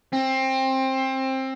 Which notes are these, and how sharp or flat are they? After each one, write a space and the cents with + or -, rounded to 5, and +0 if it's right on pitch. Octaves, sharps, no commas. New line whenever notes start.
C4 +20